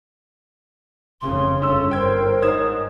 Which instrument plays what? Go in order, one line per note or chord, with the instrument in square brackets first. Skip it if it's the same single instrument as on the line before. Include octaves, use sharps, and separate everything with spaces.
[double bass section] F1 C#3 [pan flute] C6
[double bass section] G1 [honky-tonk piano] C#4 E6 [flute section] A4
[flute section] A#4 C5 C#5 [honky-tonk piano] G5 G#6
[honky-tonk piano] G#2 G#6 E7 [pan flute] D#6